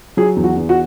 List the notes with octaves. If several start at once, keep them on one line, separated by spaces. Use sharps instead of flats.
F#3 G#4
E2
F#4
E2
F#4